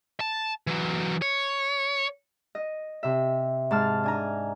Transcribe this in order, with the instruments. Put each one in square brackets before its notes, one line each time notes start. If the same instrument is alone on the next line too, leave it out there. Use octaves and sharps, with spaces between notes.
[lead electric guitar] A5
E3 F#3
C#5
[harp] D#5
C3 E5
G#2 A5 F6
D4 G#5 A#5